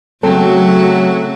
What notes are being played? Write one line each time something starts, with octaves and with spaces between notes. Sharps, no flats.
C#3 F#3 A3 C4 F#4 A4 F#5